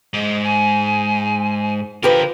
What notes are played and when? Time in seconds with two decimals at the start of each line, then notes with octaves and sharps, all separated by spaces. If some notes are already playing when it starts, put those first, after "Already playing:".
0.14 G#2 D#5
0.43 G#5
2.03 D3 F3 G4 A#4 B4